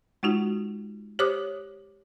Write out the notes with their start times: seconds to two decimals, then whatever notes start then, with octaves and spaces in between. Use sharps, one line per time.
0.23 G#3 D#4 F4 F#4
1.19 G4 C5 C#5 D6 D#6 F#6